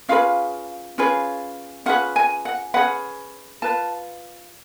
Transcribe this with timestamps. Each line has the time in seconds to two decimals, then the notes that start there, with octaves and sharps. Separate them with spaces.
0.09 C#4 F4 G#4 B4 F5
0.98 C#4 F4 G#4 B4
1.86 C#4 F4 G#4 B4 F#5
2.16 G#5
2.45 F#5
2.74 C#4 F4 G#4 B4 F#5
3.62 F4 B4 A5